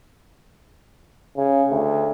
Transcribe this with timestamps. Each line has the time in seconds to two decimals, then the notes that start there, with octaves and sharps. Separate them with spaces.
1.37 C#3
1.71 D2